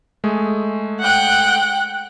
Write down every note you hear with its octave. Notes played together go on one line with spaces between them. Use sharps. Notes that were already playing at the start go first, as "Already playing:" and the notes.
G#3 A3 G#4
F#5 G5 F#6